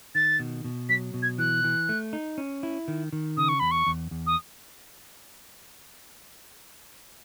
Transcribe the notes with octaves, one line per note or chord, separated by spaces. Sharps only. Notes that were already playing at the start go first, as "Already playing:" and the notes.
D#3 A6
B2
B2
F#3 B6
B2
G#6
E3 F#6
E3
A3
D#4
C#4
E4
D#3
D#3
C#3 D#6
C#6
E2 B5
C#6
E2
E2
D#6